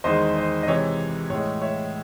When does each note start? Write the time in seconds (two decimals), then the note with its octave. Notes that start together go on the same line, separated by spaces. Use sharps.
0.04 E2 D#3 G#3 C5 D#5
0.36 C5 D#5
0.63 D#5
0.67 C3 E3 G#3 C#5
1.30 A2 E3 G#3 C#5
1.61 C#5 E5